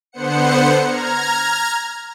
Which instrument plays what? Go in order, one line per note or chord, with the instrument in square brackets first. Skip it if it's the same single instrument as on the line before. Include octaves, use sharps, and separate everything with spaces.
[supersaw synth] D3 B3 C5 F#5 C#7
A#5 F6 G#6